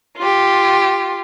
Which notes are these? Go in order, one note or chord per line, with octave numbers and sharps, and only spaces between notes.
F4 G4